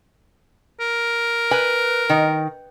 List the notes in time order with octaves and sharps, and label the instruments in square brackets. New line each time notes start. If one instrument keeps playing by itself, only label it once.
[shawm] A#4
[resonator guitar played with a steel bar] B4 G#5
D#3